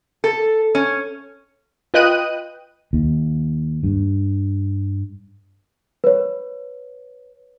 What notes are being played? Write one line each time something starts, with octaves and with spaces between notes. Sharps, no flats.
A4
C#4
F4 B4 D#5 G5 F#6 D#7
D#2
G2
B4 C#5